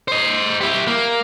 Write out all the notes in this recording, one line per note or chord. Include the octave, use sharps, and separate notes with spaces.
C5 D#5
E4 G4
A#3